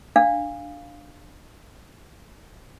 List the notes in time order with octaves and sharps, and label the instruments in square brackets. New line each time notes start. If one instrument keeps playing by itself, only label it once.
[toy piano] D4 F5